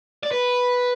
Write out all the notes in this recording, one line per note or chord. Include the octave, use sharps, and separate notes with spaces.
D5
B4